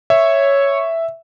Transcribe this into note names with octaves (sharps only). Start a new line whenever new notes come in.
C#5 E5